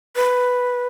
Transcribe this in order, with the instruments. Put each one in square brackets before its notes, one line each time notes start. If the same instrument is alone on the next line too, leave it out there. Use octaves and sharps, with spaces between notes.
[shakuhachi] B4